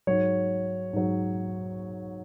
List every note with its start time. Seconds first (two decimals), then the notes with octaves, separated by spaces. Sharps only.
0.07 G#2 F#3 C#5
0.93 G#2 F#3